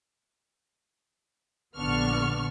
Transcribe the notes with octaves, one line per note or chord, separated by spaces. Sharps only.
A#1 D3 B3 D4 C#6 F6